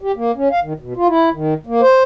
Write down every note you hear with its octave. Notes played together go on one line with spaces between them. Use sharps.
G4
A#3
C#4
F5
D#3
B2
F4
E4
D#3
A#3
C5